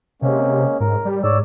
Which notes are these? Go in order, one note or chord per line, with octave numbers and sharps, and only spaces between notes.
C3 G#3 A#3 C#4
G#2 A#4
G3
G#2 C#5 D5 E6